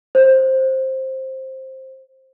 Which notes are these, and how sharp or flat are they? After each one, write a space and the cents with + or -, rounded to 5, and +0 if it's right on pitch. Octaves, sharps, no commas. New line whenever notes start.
C5 +10